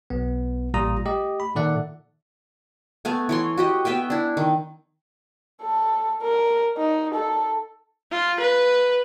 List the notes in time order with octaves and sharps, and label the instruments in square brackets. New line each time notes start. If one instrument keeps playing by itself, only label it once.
[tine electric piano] B1 B3
A1 A#2 G3 F4 A#5 D#6
A3 G4 D#5
B5
A#2 D#3 A4 D5 E5 F#5
[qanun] A3 B3 G#5
E3 C#5 C6
F#4 G4 D#5
B3 E5 G5 G#5
D4 E4
D#3
[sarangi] A4
A#4
D#4
A4
F4
B4